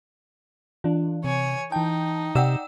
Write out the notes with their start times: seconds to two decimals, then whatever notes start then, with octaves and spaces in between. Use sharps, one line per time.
0.84 E3 D4 F4
1.24 C3 C#5 G#5
1.72 E3 D#4 G5 A5
2.35 C3 D5 F#5 G5 E6 E7